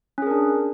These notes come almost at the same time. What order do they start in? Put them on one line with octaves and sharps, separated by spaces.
C#4 G#4 A#4 D4